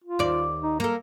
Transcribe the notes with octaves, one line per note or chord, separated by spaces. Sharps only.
F4
D#2 D5
D#4
A#3 A4 A#4